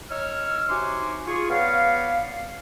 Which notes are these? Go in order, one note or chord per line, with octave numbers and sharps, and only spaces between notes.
D#4 C#5 E6 F6
C3 D#4 F#4 G#5 C6 D6
F4 G#4 C#6
B3 C#5 D5 F5